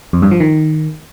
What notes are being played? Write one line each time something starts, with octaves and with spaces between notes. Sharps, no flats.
F2
G2
F3
D#3